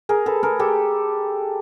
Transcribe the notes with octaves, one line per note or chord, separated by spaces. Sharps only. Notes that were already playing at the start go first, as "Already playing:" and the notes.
G#4 A#4
A4 B4
G#4 A#4
G4 A4